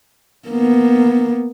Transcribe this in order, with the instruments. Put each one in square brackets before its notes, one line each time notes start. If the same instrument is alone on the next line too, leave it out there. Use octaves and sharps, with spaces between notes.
[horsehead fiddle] A#3 B3